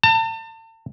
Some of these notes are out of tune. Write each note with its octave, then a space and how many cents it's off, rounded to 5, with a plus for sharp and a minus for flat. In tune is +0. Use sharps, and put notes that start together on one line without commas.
A5 +35